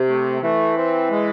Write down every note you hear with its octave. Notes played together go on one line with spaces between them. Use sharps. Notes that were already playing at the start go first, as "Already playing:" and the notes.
Already playing: C3
A3
E3 A3
C4
G#3